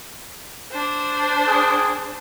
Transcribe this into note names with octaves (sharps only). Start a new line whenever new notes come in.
D4 C5
G#4